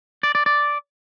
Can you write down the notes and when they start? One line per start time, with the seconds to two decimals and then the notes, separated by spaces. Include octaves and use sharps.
0.23 D5
0.35 D5
0.46 D5